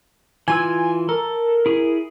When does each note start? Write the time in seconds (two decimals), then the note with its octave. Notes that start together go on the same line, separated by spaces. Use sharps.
0.48 E3 F4 G#5 E6
1.09 A4 A#4
1.66 E4 G#4